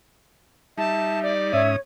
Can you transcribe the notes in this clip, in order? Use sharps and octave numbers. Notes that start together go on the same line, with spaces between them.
G3 D#4 E5 A5
D5
G#2 C#4 C#5 E5 D#6